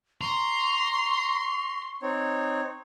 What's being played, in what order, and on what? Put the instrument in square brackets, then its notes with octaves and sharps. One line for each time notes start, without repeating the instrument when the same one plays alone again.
[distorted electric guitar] A#5 [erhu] C6 [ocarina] C#6
[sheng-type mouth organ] C4 D#4 C#5